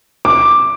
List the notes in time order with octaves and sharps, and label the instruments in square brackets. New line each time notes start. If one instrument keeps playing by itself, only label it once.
[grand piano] D6